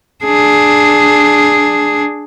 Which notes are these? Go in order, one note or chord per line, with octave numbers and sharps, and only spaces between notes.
D4 G#4